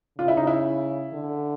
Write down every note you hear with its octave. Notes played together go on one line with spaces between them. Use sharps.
C#3 F4
E4
D#4
E4
D3